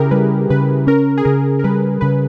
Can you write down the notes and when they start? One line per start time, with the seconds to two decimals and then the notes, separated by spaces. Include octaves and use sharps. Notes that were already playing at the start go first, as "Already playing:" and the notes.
Already playing: C#3 E4 G4 G#4 A#4
0.11 G3 B4
0.50 C#3 B4
0.87 C#4 A#4
1.18 G#4
1.25 C#3 A#4
1.59 A#4
1.64 G3 B4
2.01 C#3 B4